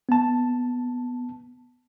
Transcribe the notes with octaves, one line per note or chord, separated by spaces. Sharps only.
B3 A5